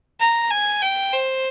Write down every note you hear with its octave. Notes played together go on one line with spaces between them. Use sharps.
A#5
G#5
G5
C5